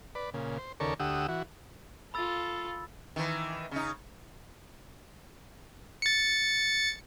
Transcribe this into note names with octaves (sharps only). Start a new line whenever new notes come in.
B4 D5
A#2 C#3
C5
D#2 C#3 A4 A#4 D5 C#6
D2 G4 F#5 D#6 E6
E3 F#4
F4 A4 B5 E6 A6
D#3 E3
C#3 D#4
A6 C#7